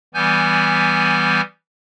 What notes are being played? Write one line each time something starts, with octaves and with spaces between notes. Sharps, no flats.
E3 G3 B3 G#5 G6